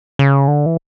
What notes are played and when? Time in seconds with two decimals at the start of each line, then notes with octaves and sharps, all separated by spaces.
0.19 C#3
0.48 D3
0.66 E3